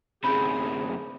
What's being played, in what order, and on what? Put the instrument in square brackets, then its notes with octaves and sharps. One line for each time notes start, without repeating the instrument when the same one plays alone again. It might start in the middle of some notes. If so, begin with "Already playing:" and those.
[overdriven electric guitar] F#2 C3 [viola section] G#4 [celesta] B5 G6